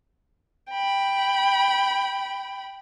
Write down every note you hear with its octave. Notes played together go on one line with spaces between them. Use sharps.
G5 B5